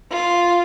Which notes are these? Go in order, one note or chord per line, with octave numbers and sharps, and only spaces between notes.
F4